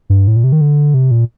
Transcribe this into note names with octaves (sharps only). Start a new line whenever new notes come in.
G2
A2
A#2
C3
D#3
D3
C3
A#2